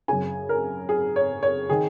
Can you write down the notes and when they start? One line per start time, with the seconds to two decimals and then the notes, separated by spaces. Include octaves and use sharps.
0.08 F#2 C#3 G#5
0.49 A#4
0.89 G#4
1.16 C#5
1.43 C#5
1.70 D#3 G#4